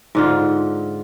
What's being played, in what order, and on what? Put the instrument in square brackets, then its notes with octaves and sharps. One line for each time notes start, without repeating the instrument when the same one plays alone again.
[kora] G#2 D3 F4